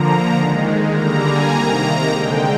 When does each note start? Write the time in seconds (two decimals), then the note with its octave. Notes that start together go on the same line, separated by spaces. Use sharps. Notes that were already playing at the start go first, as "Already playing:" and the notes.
Already playing: D3 F3 A#3 A#5
0.35 D#3 G#3
0.93 D3 G3 A#3 A#5
1.23 G#5
1.52 C3 D#3 A#3 A#5
2.11 D3 G#3 G5